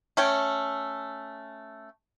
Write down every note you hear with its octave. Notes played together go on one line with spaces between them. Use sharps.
A3 C#4 G5